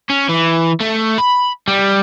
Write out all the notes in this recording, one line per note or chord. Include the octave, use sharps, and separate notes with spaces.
C#4
E3
A3
B5
G3